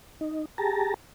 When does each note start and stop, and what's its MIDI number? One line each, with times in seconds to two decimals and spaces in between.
0.21 0.45 63
0.58 0.94 67
0.58 0.94 68
0.58 0.94 81
0.58 0.94 82